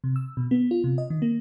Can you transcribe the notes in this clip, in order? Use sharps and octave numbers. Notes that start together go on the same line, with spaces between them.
C3
E6
B2
B3
F4
C3
D#5
D#3
A#3